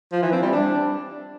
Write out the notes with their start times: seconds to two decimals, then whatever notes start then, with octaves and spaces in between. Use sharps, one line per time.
0.12 F3
0.22 E3
0.33 C4
0.43 G3
0.53 D4